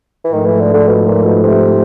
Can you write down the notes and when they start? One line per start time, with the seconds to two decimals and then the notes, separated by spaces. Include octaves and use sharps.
0.24 E3
0.32 G#2 D#3 F3 A3
0.46 E3
0.60 D3
0.74 D3
0.88 B2
1.07 A#2
1.24 B2
1.43 C3